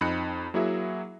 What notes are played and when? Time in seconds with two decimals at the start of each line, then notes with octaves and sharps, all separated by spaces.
0.01 F2 C4 D#4 B5 F#6 C#7
0.54 F#3 A#3 E4 F#4 G#4 E5